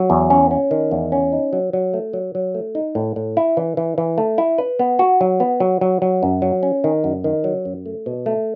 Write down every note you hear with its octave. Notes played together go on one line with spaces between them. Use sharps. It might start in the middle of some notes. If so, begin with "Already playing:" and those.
Already playing: F#3
E2
C#4
C#4
D#3
E2
C#4
D#4
F#3
F#3
A3
F#3
F#3
A3
D#4
A2
A2
E4
E3
E3
E3
A3
E4
B4
B3
F#4
F#3
B3
F#3
F#3
F#3
F#2
F#3
C#4
D#3
F#2
D#3
F#3
F#2
A3
B2
A3